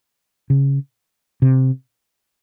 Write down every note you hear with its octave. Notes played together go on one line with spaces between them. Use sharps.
C#3
C3